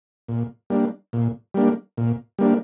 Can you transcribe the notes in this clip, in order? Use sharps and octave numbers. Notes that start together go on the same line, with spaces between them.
A#2
G3 A#3 D4
A#2
G3 A#3 D4
A#2
G3 A#3 D4